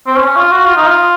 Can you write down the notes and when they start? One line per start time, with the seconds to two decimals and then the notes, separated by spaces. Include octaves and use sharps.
0.07 C4
0.16 C#4
0.26 C#4
0.36 F4
0.51 F#4
0.65 F4
0.77 D#4
0.87 F4